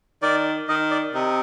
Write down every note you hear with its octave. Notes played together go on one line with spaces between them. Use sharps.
D#3 D5
D#3 D#5
D5
C3 D#4